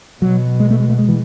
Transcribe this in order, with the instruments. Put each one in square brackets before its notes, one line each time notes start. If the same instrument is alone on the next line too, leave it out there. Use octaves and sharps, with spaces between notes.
[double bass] B2 [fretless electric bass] F#3
[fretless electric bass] G#3
A3
G#3
A3
G#3
E3